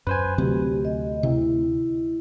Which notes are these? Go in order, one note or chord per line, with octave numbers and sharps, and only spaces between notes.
F#2 B4 C5 G#5
D2 C3 F#3 C4 G4
D#5
C3 E4